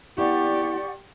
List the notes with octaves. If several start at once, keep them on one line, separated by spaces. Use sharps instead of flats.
B3 E4 G4 D5 F#5 C#6